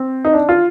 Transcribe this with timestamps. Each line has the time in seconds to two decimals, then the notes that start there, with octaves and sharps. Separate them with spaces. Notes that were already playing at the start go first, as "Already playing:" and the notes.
Already playing: C4
0.25 D#4
0.33 D4
0.49 F4